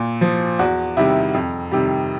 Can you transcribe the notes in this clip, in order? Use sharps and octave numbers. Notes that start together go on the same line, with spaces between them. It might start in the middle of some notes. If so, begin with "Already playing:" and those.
Already playing: A#2
F3
E2 F#4
C3 D#3 G3 E4
F2
C3 D#3 G3